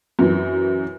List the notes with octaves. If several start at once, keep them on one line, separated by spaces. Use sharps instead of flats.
F#2 E3 F#3